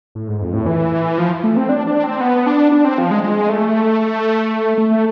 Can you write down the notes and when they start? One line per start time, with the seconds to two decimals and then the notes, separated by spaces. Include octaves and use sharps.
0.15 A2
0.28 G#2
0.42 F2
0.53 A2
0.66 E3
1.18 F3
1.44 A3
1.57 C4
1.69 D4
1.87 D4
2.04 C4
2.21 B3
2.47 D4
2.72 D4
2.85 C4
2.98 F3
3.11 G#3
3.24 G#3
3.49 A3
4.78 A3